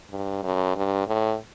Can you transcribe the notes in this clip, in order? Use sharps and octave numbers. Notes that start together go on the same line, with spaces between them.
G2
F#2
G2
A2